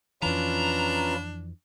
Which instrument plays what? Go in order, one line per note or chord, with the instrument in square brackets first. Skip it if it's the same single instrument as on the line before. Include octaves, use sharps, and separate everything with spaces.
[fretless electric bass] F2 E3 [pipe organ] C#4 F4 B4 [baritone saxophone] D4 [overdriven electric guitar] A#5